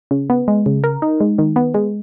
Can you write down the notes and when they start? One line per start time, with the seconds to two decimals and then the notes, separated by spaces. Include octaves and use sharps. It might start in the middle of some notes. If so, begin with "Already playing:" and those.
0.11 C#3
0.30 B3
0.48 G#3
0.66 C#3
0.84 A#4
1.02 D#4
1.20 G#3
1.38 D#3
1.56 B3
1.74 G#3